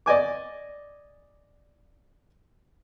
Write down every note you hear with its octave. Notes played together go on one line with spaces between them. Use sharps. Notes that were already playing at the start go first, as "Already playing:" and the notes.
D5 D#5 G#5 D6